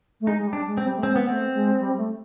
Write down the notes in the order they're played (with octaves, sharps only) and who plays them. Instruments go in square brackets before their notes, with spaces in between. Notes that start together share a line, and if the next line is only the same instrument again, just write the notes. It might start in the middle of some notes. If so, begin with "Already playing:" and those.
[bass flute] A3
[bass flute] G#3 [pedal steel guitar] D#4
[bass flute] G#3
G3
[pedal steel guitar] D4
[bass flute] G#3
[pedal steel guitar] C4
[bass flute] G3
A3
[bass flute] G#3 [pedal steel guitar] C4
[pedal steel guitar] B3
[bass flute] A3 [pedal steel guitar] C4
[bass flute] G#3
G3
A3